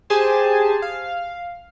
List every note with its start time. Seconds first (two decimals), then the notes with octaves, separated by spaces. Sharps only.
0.10 G4 G#4 C5 G#5 A5
0.82 F5